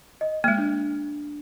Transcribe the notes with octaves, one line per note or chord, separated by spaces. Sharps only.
D#5
G#3 A#3 F6
D4